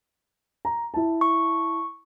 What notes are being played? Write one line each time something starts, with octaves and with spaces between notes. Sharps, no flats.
A#5
E4 A5
C#6